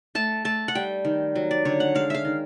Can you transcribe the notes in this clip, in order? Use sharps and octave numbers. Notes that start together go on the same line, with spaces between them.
A3 A5
A3 A5
F#5
G3 G5
D#3
F#3
D5
D3 C#5
F#5
G#3 F5
E5 F5
D#3